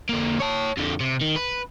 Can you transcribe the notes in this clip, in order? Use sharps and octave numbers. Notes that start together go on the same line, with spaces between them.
D3 A#3
C#5 A5
F2 D3
C3
D#3
B4